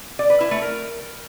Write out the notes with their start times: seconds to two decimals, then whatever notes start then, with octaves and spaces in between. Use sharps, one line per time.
0.19 D5
0.30 B4
0.40 E4
0.51 A3
0.62 A#4